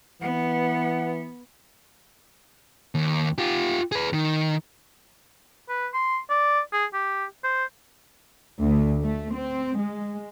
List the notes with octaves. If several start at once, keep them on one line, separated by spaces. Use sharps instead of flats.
E3 B3 F#5
D#2
F4 G4
G#4 B4
D#3
B4
C6
D5
G#4
G4
C5
D2
A3
C4
G#3